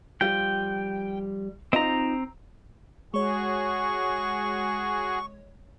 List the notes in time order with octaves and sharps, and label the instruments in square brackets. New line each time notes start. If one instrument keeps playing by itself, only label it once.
[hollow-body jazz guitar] F3 G3 F4 [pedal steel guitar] G5
[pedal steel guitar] C4 A#5 [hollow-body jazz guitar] D#4 F4 D#5
[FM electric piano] G#3 C#5 [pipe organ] F#4 G#4 [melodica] C#6